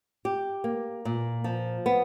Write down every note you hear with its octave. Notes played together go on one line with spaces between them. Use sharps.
G4
A#3
A#2
F3
B3